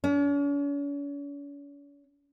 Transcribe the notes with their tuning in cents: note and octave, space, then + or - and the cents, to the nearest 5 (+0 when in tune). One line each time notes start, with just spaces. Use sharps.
C#4 +45